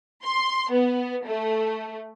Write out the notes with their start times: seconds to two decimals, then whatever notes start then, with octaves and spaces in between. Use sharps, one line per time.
0.24 C6
0.71 B3
1.26 A3